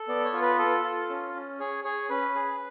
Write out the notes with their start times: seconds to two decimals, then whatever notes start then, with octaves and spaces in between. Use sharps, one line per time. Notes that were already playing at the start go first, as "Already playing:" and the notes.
Already playing: A4
0.08 B3 D5
0.25 C#5
0.33 F4
0.42 B4
0.58 A4
0.84 F4
1.09 C#4
1.34 C#4
1.60 G#4 C#5
1.84 G#4 C#5
2.10 C#4 B4
2.35 G#4